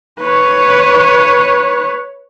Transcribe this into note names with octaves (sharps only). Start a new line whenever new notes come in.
B4 C#5